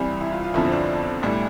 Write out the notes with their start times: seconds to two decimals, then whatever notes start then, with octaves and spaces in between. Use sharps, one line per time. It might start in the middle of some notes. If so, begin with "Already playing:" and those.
Already playing: C2 C3 E3 G3 E4
0.21 E4
0.32 F4
0.44 F4
0.54 G1 F2 D3 F3 E4
0.65 C4
0.72 D4
1.23 B1 A2 G3